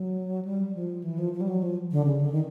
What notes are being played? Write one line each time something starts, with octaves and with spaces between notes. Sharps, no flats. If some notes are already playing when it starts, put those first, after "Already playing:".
Already playing: F#3
G3
F3
E3
F3
F3
G3
F#3
F3
D3
C#3
D3
D#3